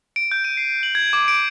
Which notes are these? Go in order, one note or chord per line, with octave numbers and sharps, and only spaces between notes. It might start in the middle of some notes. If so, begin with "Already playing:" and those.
D7
G6
D#7
C7
F#7
G#6
D6
D7